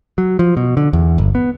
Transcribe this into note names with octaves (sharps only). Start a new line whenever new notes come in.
F#3
F3
B2
D3
E2
G1
B3